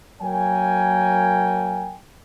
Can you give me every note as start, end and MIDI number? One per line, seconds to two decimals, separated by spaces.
0.22 1.94 54
0.22 1.94 58
0.22 1.94 70
0.22 1.94 73
0.22 1.94 79
0.22 1.94 80